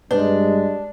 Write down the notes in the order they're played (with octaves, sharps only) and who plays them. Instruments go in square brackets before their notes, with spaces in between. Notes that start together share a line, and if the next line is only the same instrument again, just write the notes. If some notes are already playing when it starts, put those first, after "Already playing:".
[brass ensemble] G2 [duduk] G#3 [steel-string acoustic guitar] D4 [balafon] B4